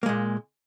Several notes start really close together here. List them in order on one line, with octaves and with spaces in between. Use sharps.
A#3 G#3 A#2